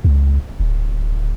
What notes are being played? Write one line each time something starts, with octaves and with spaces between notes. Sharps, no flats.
C#2
D1